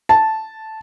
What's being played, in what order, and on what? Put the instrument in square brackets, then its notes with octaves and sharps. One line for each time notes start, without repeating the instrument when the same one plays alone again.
[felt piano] A5